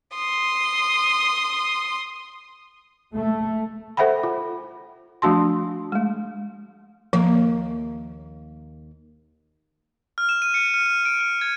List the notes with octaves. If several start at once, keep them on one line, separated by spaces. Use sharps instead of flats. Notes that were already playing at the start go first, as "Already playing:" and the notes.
C6 D#6
A3
A4 C5 E5 F#5 G5 B5
F4
F3 A3 D4 F#4 A5 C6
G#3 A3
D#2 F3 A#3
F6
E7
D#7
C#7
F6
F6
D7
F6
G#6